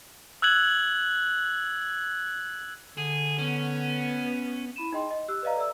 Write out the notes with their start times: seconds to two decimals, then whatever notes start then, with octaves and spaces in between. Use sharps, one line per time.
0.42 E6 F#6 G#6 F#7
2.97 D3 G#4
3.39 B3 C#4
4.76 E4 B5 D#7 E7
4.92 D#4 G#4 D#5 G5 C6
5.11 D#5
5.28 G4 E6 F#6
5.43 B4 D5 D#5 F5 A#5
5.56 A4 D5 E5 E6